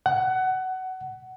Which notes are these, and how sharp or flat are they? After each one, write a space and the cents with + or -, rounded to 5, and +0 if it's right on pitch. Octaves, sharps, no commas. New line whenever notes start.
F#5 +20